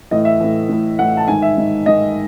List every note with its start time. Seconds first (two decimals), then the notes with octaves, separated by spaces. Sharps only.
0.11 A2 E3 D#5
0.25 E5
0.40 A2 E3
0.69 A2 E3
0.99 A2 E3 F#5
1.17 A5
1.28 G#2 D#3 G#5
1.42 E5
1.57 G#2 D#3
1.86 G#2 D#3 D#5